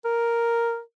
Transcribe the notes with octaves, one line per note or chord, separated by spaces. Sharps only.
A#4